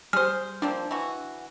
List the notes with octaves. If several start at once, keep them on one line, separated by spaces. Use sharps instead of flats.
G3 G#4 C5 F6
F3 A#3 C4 D4
E3 F#4